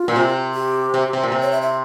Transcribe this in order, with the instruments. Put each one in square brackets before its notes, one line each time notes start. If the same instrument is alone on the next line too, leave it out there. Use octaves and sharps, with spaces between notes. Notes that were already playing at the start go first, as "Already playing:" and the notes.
Already playing: [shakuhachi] F4
[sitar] A#2
C3
[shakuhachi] G4
[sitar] C3
C3
A#2
C3
[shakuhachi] C#5
E5
E5